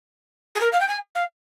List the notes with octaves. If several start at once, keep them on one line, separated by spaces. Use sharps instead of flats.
G#4
A#4
F5
G5
G#5
F5